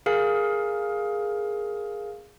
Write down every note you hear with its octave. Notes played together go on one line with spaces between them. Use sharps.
G#4 A#4 F5